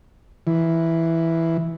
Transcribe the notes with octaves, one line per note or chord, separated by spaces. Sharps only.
E3